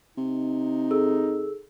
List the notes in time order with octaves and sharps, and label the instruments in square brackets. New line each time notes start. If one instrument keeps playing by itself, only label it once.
[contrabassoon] C3 [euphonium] D#4
[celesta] G#4 A4 E6